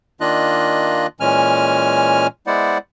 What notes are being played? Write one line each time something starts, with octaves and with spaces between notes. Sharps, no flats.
D#3 A#3 D4 F4 D#5 F#6
A#2 E3 G#3 C#4 G#5 F6
G#3 B3 E4 C5 D5 F#5